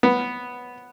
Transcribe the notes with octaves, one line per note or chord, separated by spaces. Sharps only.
B3